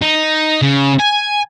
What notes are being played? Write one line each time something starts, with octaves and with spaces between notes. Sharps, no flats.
D#4
C#3
G#5